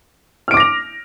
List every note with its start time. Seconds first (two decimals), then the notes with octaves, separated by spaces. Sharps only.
0.48 F6
0.51 D7
0.54 D6
0.57 A#6
0.60 F7